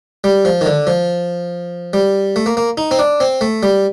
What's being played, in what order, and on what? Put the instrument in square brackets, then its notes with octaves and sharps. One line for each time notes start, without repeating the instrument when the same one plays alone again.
[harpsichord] G3
F3
D#3
D3
F3
G3
A3
A#3
A#3
D#4
C4
D4
C4
A3
G3